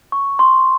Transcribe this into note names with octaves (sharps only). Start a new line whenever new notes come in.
C#6
C6